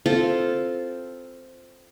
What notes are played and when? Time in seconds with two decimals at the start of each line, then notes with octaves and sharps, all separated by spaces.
0.06 C4 F4 A4